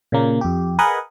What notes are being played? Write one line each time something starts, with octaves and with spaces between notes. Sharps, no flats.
A#2 C#3 A#3
F2 G4
G#4 A#4 B4 D#5 F#5 G#5